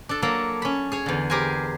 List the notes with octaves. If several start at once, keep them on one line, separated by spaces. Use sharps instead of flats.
D4 A4
F#3 A#3 A4
C#4 B5
G#4 C#5
E2 D3
G4 G#4 A#4 C5 G#5